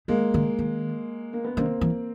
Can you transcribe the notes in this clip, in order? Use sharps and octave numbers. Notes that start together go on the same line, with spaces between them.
D#3 G#3 A#3
D3
D#3
A#3
B3
D#3 A#3 C4
E3